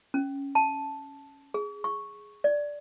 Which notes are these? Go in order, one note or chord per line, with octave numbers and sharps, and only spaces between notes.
C#4
A5
G#4
C#6
D5